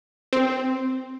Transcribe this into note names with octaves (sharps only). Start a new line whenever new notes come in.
C4